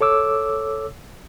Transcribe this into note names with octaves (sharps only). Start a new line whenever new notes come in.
A4 C#5 D6 E6